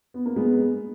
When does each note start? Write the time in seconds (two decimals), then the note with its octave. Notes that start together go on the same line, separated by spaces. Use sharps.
0.14 B3
0.26 A#3
0.36 G#3 B3